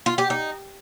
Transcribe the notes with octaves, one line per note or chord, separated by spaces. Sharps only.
F4
G4
D#4